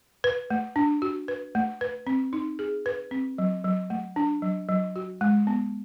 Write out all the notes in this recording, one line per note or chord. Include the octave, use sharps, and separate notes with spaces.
B4
A3
D4
F#4
B4
A3
B4
C4
D#4
G#4
B4
C4
F#3
F#3
A3
D4
F#3
F#3
F#4
G#3
B3